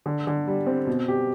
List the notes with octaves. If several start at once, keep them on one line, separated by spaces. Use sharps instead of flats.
D3
D3
G3
C4
B2
G4